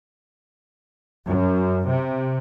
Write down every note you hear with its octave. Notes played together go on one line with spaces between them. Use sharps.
F#2
C3